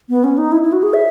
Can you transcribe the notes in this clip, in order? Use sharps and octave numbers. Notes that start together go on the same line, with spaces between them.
B3
C#4
D#4
E4
E4
F#4
G#4
E5